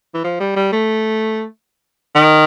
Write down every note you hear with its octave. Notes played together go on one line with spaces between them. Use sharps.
E3
F3
G3
G3
A3
D#3